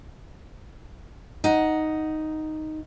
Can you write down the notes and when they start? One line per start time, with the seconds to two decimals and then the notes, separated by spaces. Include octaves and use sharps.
1.44 D#4 F#5